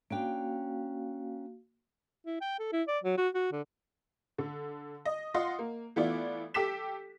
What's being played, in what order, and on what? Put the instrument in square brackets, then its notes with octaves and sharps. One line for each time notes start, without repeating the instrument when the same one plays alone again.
[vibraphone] A#3 F#4 F5 [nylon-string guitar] C#4 D4 G5
[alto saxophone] E4
G5
A4
E4
D5
F#3
F#4
F#4
D3
[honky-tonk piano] D3
D#5
F4 D#5 F#5 C6
A#3
E3 A3 B3 E4 F4 D5
G4 A4 D6 B6 E7